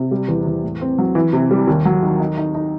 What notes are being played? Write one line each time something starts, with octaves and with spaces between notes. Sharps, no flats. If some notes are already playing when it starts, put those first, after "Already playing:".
Already playing: C3
G3
E2
E2
A2
C4
F#3
E3
C3
G3
D#2
F#3
D#3
D#4
D#4
D#4